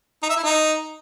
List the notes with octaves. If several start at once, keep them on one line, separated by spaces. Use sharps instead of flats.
D#4
E5
E4
D#4